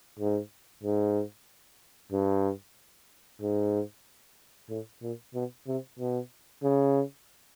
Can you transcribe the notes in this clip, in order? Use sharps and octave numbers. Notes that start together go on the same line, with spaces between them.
G#2
G#2
G2
G#2
A2
A#2
B2
C3
B2
C#3